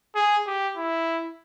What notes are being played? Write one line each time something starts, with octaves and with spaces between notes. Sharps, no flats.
G#4
G4
E4